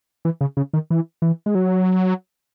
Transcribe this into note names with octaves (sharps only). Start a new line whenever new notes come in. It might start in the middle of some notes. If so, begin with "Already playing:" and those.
E3
C#3
C#3
D#3
E3
E3
G#3
F#3